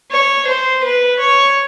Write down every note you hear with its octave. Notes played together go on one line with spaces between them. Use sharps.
C#5
C5
B4
C#5